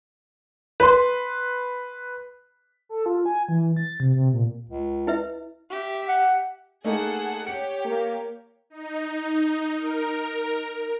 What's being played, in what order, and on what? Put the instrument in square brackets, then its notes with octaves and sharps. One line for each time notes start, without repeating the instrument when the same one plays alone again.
[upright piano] B4 C6
[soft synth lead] A4
F4
G#5
E3
A6
C3
C3
A#2
[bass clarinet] C#2
[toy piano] E4 B4 E5
[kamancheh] G4 E5
[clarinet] F#5
[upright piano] A3 A#3 D#4 [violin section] G#4 A4 F#5
[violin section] G4 C#5 [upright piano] C#7
[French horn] A#3
[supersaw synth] D#4
A#4